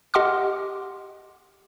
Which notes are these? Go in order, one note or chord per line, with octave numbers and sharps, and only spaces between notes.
G4 D#5 F#5 C6 D6 F6